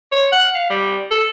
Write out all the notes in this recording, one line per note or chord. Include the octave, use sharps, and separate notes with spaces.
C#5
F#5
F5
G3
A4